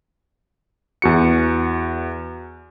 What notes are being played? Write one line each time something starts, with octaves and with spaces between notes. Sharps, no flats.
E2 F#4 C#7